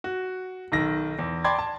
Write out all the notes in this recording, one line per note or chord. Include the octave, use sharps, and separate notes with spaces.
F#4
B1 D#3 A#6
E2
D5 G5 A5 B5 C6 G#6
A5